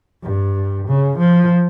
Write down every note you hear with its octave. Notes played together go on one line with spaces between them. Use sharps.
G2
C#3
F3